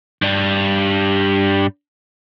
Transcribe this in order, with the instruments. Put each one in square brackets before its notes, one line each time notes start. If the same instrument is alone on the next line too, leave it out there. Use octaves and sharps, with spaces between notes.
[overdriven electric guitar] G2 G3